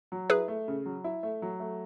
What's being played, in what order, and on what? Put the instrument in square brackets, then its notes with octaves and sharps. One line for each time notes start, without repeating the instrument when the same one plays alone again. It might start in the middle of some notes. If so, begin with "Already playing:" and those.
[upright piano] F#3
[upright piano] E4 [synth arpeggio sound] G#4 B4
[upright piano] A3
C#3
F#3
E4
A3
F#3
A3